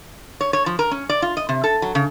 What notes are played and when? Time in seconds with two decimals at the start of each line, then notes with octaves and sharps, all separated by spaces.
0.41 C#5
0.53 C#5
0.66 F3
0.79 A#4
0.91 C#4
1.09 D5
1.22 F4
1.37 D#5
1.49 C3
1.64 A4
1.82 F#3
1.95 C#3